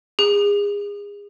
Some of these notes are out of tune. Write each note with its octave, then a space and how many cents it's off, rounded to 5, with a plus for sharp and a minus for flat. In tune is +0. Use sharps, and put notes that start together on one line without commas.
G#4 -30